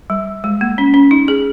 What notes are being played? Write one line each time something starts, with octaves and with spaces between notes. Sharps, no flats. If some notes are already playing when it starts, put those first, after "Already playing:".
G3
G#3
A#3
C#4
C#4
D#4
G#4